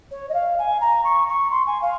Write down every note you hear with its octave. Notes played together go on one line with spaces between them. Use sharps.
C#5
D#5
F5
G#5
A#5
C#6
C#6
C6
G#5
F5